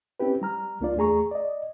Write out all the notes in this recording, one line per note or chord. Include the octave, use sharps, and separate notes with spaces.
C4 C#4 E4 G4 B4
G3 A#5 F6
C#2 A#3 D4 F4 D5
E2 A3 G#4 A#5 C#6
D5 D#5